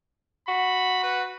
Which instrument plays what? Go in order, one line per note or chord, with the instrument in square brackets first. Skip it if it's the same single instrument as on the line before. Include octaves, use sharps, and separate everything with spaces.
[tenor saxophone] F#4 [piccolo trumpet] B5
[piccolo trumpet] B4